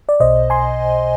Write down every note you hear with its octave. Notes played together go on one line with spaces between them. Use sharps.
D5
B1 B2 C5 D#5
G#5 C6